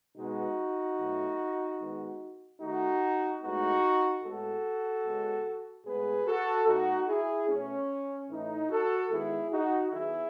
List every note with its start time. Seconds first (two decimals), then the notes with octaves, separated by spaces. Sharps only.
0.17 B2 G#3 B3 D#4 F#4
0.98 B2 F#3 A3
1.80 D#3 G#3 B3
2.61 D#3 A3 D#4 F#4
3.42 A2 G#3 B3 D#4 F#4
4.23 A2 G#3 B3 F#4 A4
5.05 C#3 G#3 B3
5.86 A2 G#3 B3 G#4 B4
6.27 F#4 A4
6.67 B2 A3 D#4 F#4
7.08 E4 G#4
7.48 B2 A3 C#4
8.29 A2 E3 A3 D#4
8.70 F#4 A4
9.11 D#3 G#3 B3 E4 G#4
9.52 D#4 F#4
9.92 D#3 F#3 B3 E4 G#4